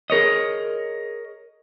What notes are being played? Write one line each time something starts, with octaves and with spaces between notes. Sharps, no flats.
G#4 A#4 C#5 D#5